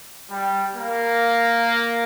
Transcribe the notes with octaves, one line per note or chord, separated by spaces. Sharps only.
G3
A#3